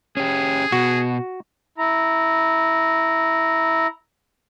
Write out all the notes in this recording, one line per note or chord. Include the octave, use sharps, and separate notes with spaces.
C#4 G4 G#4
B2 F#4
E4 A#5